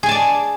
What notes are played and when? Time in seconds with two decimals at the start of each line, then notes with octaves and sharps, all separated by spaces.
0.03 G#4
0.06 G#5
0.09 A5
0.11 D5